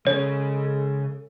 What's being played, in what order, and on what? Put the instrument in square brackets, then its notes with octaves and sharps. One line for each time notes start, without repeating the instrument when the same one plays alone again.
[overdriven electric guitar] C#3 [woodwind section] G#3 A4 [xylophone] C#5